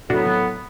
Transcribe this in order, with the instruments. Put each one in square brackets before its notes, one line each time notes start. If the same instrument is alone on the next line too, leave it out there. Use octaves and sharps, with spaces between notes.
[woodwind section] A2 F#3 B3 [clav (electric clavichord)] D4 F#4